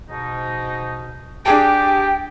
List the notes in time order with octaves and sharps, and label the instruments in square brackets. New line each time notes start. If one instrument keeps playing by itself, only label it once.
[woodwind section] G#2 B2 D#4
[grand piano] D4 G#4 A5 [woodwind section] G4 [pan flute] G5